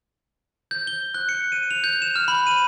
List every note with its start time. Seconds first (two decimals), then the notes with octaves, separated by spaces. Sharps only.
0.71 G6
0.87 G7
1.14 F#6
1.29 C#7
1.52 D#7
1.71 F7
1.84 G6
2.02 E7
2.16 F6
2.28 B5
2.47 D#7